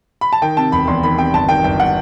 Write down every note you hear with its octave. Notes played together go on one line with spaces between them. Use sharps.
B5
A5
D#3 G5
C3 A5
E1 B5
E2 C6
D#3 B5
C3 G5
G1 A5
D#3 G5
G1 G5
F#5